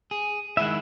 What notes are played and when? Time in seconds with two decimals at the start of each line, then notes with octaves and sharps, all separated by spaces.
0.11 G#4
0.57 D#3 G#3 E4 E5 F#5